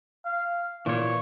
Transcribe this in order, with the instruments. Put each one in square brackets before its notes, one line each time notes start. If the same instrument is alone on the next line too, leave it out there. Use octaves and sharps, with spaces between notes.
[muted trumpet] F5
[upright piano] A#2 [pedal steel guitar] E3 C#5 [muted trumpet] C#6